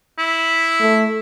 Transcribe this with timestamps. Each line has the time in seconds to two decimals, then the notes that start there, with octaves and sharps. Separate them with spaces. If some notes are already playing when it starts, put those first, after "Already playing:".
0.19 E4
0.81 A3